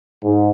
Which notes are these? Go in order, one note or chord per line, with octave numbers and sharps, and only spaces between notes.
G#2